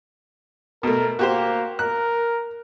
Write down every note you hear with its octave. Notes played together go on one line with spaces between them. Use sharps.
B2 A3 A#4
A#3 F#4 G4 C5
A#4 F#6